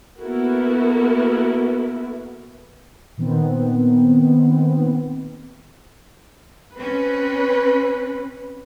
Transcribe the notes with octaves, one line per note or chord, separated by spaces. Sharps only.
A#3 B3 E4 F#4 A4 A#4
A#2 D#3 B3 C4
C4 C#4 B4